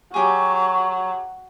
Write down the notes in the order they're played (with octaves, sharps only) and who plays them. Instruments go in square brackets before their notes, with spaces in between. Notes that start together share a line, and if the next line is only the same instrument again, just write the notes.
[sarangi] F#3 [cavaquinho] G4 G#4 [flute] C#6